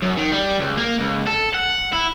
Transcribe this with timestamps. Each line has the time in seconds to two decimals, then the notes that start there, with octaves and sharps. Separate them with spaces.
0.02 F#2
0.17 D#3
0.32 G3
0.60 C#2
0.77 A#3
1.00 C#2
1.27 A4
1.54 F#5
1.93 E4